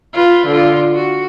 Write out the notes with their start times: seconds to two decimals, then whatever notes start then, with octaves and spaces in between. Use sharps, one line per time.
0.13 F4 B4
0.46 D3 F4
0.95 F#4